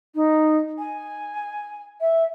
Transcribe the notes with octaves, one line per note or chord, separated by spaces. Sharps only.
D#4
G#5
E5